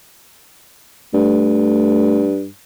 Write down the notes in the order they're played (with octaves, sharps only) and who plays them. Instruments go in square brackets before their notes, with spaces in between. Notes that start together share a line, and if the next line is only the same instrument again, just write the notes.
[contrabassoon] G2 [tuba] A3